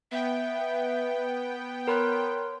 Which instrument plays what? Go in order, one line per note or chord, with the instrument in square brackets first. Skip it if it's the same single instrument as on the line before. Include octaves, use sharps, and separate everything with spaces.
[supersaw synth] B3 G5 [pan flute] E5
[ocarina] B4
[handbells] A#4 B5 F#6 [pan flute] C#5 [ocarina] C6